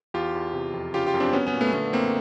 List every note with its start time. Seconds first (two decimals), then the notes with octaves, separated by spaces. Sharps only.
0.14 E2 F4 G4
0.35 E2
0.53 C3
0.73 F2
0.94 C#3 F4 G4
1.07 F4 G4
1.14 F#2
1.20 C4 D4
1.33 F#3 B3 C#4
1.47 B3 C#4
1.54 A#2
1.61 A3 B3
1.73 D3 A3 B3
1.93 F#2 A#3 C4